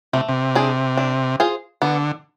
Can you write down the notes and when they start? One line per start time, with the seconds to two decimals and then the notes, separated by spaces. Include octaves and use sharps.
0.13 C3 A3
0.29 C3
0.55 D4 G#4 D5
0.97 D4
1.40 F4 G#4 C5
1.82 D3 B3